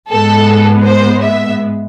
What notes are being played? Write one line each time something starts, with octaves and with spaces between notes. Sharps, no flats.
G#2 G#3 B3 A4
C5
E5